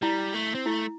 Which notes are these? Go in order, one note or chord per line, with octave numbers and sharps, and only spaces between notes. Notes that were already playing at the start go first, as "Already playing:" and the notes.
G3 E4
A3
C4
A3 E4